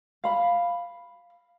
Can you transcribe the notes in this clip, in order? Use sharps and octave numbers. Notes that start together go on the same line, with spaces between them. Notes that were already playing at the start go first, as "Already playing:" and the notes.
F5 B5